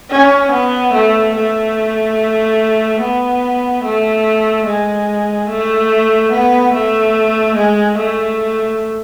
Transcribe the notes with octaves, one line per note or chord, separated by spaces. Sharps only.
C#4
B3
A3
A3
B3
A3
G#3
A3
B3
A3
G#3
A3